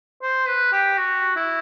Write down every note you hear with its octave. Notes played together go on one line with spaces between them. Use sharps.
C5
B4
G4
F#4
E4